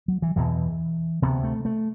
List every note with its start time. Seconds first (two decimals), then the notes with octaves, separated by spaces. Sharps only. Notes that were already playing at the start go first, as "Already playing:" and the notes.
0.08 F#3
0.22 E3
0.36 E2 B2 E3
1.22 D2 C3 B3
1.44 A3
1.65 A3